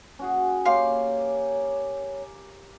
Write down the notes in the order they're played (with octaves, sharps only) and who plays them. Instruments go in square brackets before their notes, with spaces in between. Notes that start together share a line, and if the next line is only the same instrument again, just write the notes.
[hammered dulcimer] C#4 F#4 G#4
[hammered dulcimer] A#3 G4 [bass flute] C#5 [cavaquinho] F5 C6